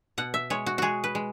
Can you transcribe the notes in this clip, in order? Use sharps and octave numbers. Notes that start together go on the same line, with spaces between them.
B2 F#5
E5
G#3 C#5
F#4
G#3 F#4 G#4
B4
G#3